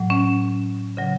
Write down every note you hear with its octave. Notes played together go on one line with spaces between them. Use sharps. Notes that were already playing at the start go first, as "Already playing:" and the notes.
Already playing: A2 F#3
C#4
C#3 F#3